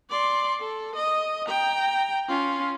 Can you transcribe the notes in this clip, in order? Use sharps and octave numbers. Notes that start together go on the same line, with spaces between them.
D5 C6
A4
D#5
G5 A#5
C#4 F4